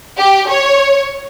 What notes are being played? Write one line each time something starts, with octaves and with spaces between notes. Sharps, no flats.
G4
C#5